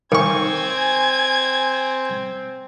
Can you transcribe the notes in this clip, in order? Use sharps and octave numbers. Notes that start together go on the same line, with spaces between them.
D#3 C4 G#5 C#6 G#6